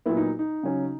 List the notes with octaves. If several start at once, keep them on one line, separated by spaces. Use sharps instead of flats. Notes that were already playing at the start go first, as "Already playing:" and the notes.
A#2 F#3 B3 E4
D#4
D#4
C#3 F#3 C#4